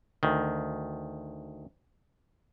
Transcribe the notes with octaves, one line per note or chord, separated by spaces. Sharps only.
D2 D#3